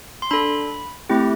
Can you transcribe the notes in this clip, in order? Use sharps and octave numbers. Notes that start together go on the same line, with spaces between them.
C6
D4 A4 B5
A3 C4 E4 G4